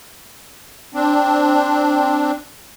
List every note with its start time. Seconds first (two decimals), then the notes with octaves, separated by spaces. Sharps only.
0.94 C4 D4